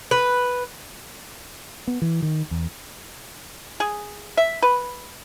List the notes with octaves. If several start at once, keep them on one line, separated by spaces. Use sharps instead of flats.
B4
B3
E3
D#3
E2
G#4
E5
B4